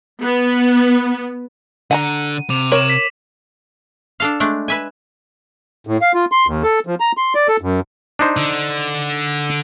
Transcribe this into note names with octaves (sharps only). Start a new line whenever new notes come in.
B3
D3 F#5 A5 A#5 D#7
C3 D6 F7
A#4 C#5 E7 F#7
B6
D4 A4 F5
G#3 A3 D4
B4 E5 G#5
A2
F5
F4
C6
D#2
A4
F3
A#5
C6
D5
A4
F#2
D4 D#4 C5
D3